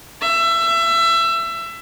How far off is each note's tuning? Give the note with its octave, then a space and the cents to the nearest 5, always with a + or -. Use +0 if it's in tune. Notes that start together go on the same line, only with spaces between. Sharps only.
E5 +25